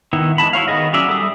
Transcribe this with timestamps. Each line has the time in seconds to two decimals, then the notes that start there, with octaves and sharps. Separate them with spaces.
0.13 D#3 B3 E4
0.38 E3 G#3 A5 B5
0.53 E4 F#4 C#5 F5
0.68 D#3 B3 G#4 D#5
0.93 F#3 C#4 G#4 D5 E5
1.08 G3 A4 E5 D#6